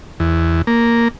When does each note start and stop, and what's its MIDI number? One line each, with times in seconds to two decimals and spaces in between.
0.20 0.62 40
0.67 1.08 58